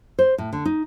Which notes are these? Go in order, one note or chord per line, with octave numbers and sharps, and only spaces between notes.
C5
A2
D3
D#4